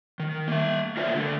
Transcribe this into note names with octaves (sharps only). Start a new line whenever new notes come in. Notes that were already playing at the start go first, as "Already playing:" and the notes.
D#3
A#3 E5
F4 A#4 B4 C#5 D5 E5
D3 A3